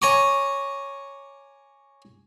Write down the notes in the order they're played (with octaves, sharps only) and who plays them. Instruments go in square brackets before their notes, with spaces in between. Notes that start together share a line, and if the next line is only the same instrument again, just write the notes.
[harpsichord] C#5 G#5 A#5 C#6 D6